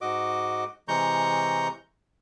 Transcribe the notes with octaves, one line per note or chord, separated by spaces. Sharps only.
G#2 F#4 D#5 D6
C3 E3 G#3 A#5 C#6 G6